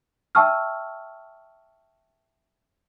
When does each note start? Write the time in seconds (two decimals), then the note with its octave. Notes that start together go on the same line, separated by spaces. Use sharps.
0.35 E5 G5 A5 C#6 E6 F6